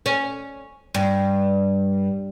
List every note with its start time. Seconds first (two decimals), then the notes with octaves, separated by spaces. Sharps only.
0.06 C#4
0.94 G2